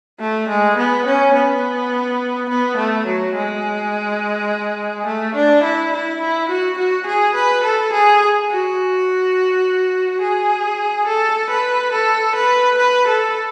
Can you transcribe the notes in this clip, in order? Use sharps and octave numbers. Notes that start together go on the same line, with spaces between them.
A3
G#3
B3
C#4
B3
B3
A3
F#3
G#3
A3
D4
E4
E4
E4
F#4
F#4
G#4
B4
A4
G#4
F#4
G#4
A4
B4
A4
B4
B4
A4